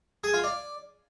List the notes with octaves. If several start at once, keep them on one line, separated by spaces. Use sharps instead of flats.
G#4
F4
D5